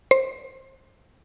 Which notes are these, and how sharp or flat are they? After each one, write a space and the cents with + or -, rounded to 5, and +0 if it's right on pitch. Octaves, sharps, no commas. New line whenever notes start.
C5 +20